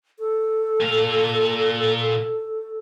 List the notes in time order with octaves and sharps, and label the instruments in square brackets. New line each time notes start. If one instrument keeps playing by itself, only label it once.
[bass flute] A4
[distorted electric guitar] A#2 F5